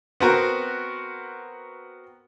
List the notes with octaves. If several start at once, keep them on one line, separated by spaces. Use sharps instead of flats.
B3 C4 F#4 A#4